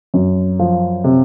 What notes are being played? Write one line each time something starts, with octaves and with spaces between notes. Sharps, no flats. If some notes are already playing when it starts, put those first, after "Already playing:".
F#2
F3
C3